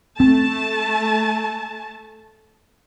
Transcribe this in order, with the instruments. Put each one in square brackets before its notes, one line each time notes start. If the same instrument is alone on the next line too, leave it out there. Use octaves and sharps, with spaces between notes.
[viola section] A3 A5 [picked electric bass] C4